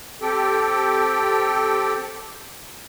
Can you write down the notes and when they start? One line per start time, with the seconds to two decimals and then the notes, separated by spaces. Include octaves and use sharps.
0.21 C4 G4 A4 G5